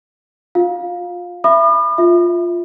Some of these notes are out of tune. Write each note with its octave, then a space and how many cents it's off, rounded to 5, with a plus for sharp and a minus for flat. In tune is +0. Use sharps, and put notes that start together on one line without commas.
F4 +25 F5 +15
E5 +20 B5 +0 D#6 -45
F4 +0 E5 -5